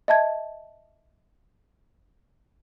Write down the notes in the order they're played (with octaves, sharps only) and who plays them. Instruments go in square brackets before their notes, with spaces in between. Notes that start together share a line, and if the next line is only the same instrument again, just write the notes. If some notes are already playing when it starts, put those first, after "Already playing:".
[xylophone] D#5 E5 A5 G#6